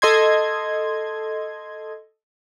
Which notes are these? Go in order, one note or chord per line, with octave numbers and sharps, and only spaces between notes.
A4 D#5 C6 G#6